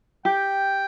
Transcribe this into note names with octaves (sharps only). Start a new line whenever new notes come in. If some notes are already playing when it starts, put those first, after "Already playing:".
G4 G5